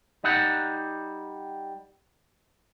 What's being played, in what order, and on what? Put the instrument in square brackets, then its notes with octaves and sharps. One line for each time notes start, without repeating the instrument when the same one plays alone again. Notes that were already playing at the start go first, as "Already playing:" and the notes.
[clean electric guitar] G3 D#4 F#5